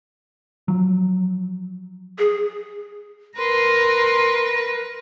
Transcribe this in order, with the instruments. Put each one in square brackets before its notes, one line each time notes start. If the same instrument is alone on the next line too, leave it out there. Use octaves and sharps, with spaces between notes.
[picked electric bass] F3 F#3
[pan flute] G#4
[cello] A#4 [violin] B4 [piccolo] C6